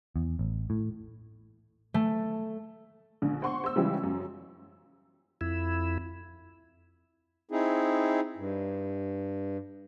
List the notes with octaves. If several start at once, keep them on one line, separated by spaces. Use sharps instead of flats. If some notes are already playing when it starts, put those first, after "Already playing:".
E2
A1
A2
A3
A#1 D3
C5 F#5 C6 C#6
C5 E6
C#3 E3 F3 G3 G#3 G4
F#2
F2 E4
C4 D#4 E4 G#4
G2